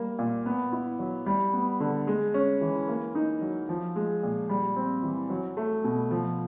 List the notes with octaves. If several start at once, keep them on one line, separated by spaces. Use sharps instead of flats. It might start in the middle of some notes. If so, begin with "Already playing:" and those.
Already playing: G3 A#3
A#2
B3
E4
F#3
G3
B3
D3
G#3
C#4
E3
A#3
D#4
F#3
F3
G#3
A#2
G3
C4
E3
F#3
A3
B2
F3